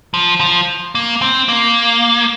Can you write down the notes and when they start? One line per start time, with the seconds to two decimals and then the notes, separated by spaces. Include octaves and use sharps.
0.14 F3
0.41 F3
0.95 A#3
1.22 C4
1.49 A#3